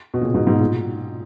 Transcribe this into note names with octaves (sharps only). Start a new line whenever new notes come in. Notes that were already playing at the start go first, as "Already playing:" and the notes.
B2
A#2 C#3
G#2 B2
G#2 B2
A#2